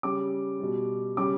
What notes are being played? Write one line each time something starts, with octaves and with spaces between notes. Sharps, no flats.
C#3 G3 D6
B2 G3
C#3 G3 D6